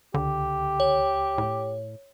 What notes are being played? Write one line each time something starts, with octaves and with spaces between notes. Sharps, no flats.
C#2 D3 G4
C#5
A2